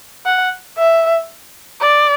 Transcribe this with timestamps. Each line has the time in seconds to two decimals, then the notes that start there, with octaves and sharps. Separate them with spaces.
0.26 F#5
0.78 E5
1.81 D5